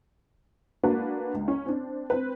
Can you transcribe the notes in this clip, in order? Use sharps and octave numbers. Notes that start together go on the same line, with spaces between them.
A#3 D4 F#4 A#4 B4
C#2
C#4
C4 D4
C4 B4